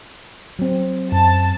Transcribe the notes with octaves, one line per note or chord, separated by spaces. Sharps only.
F#3 C4
F#2 A5